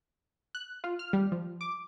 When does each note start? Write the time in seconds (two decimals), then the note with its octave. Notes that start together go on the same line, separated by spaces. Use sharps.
0.55 F#6
0.84 F4
0.99 F6
1.13 G3
1.32 F3
1.61 D6